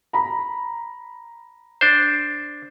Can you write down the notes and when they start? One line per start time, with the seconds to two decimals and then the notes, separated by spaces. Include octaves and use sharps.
0.13 A#5 B5
1.81 D4 C5